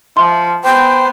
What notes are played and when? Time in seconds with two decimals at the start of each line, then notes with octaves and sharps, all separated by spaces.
0.17 F3 E5 C6
0.64 B3 C5 G5